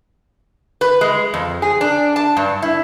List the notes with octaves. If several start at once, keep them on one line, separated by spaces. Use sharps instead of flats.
B4
G#3
F2
G#4
D4
A5
G2
E4